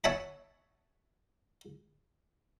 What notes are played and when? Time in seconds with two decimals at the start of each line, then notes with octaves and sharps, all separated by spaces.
0.04 C#5 E5 F#5 G#5 A5 B5